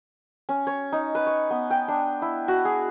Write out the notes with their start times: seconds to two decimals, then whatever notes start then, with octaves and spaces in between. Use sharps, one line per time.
0.49 C#4
0.67 C#5
0.92 D#4
1.15 B4
1.27 C#6
1.50 B3
1.70 G5
1.88 D4
2.22 E4
2.48 F#4
2.65 G#4